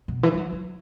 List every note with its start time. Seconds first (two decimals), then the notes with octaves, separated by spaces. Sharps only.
0.08 B2
0.23 E3
0.34 G3
0.37 F#3
0.52 F#3